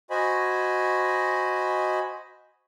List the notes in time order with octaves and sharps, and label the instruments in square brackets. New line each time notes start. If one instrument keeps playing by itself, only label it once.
[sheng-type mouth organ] F#4 C5 D#5 G#5 B5